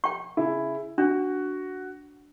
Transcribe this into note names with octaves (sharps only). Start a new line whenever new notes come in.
G5 C#6
C#3 E4
D4 F#4